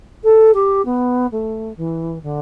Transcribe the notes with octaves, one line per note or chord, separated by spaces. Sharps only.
A4
G4
B3
A3
E3
D3